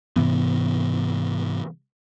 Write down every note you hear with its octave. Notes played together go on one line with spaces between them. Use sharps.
G#2 C3 E3 B3